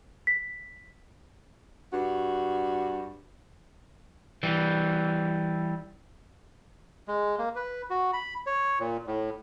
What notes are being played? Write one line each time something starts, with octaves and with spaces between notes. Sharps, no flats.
B6
G2 F#4
E3 G3
G#3
A#3
B4
F#4
B5
C#5
A#2
A2